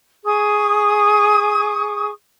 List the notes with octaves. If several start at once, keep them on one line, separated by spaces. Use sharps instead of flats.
G#4 C#6 D#6